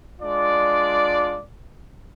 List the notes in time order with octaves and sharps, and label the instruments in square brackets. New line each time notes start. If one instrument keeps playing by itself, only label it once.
[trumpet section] G#3 D4 F4 D5